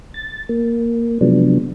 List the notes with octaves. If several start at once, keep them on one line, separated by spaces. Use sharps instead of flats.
A6
A#3
C3 F3 F#3 G#3 B3 D4